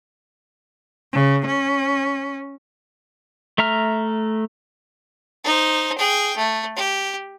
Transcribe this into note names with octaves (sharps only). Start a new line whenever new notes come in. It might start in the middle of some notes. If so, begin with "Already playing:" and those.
C#3
C#4
A3 E5 A#5 F6
D#4 C5
G#4 G5
A3
G4